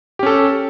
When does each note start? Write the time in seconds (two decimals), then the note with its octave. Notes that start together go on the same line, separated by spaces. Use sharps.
0.19 G4
0.23 C#4
0.26 A4